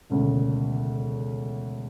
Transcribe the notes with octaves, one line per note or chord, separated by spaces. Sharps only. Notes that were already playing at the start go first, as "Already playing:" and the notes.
E1 D2 C#3